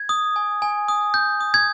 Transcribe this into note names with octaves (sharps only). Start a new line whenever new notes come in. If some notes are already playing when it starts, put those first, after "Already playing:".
Already playing: G#6
D#6
G#5
G#5
D#6
G6
D#6
G#6